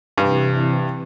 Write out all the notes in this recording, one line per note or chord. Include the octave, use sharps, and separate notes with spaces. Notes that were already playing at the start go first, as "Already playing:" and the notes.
G2 C3 E3